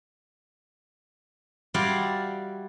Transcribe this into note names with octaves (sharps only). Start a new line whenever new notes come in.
G3 E4 F#4 D5 F5 C6